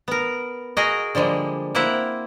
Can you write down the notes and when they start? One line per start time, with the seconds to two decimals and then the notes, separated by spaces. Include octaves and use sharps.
0.08 B3 A#4
0.77 F#4 G#4 A#4 D#5
1.15 D3 F3 G3 G#3 A#3
1.75 A#3 C4 E4 E5 F#5